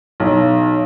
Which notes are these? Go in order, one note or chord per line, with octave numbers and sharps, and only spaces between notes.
B1